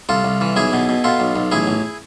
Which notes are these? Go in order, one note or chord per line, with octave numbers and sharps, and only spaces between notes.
C2 F4 A4
C2
E3
B1 E4 G#4
B2
B2
B2 F4 A4
B1
B1
A1 E4 G#4
A1